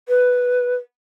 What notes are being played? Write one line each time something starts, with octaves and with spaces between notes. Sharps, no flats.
B4